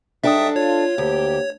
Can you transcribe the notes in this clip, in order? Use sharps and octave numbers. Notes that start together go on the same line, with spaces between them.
G#2 D3 G3 D4 A4 E5 G5 D#6
F4 C#5
D2 A#3 G4